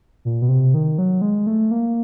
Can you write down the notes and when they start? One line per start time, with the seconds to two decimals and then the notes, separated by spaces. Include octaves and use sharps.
0.25 A#2
0.42 B2
0.49 C3
0.74 D#3
0.98 F#3
1.22 G#3
1.47 A3
1.71 A#3